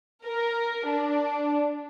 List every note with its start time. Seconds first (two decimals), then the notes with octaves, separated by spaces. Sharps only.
0.26 A#4
0.87 D4